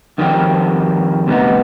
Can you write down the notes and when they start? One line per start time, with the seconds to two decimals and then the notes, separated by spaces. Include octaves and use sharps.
0.18 F2 D#3 G3 C4
1.27 D2 C3 G3 B3 D#4